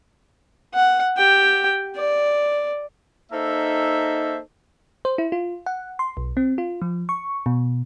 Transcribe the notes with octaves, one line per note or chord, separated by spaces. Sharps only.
F#5
G4 G5
D5
A#3 D#4 A4 C5 E5
C5
E4
F4
F#5
C6
B1
C4
F4
F3
C#6
B2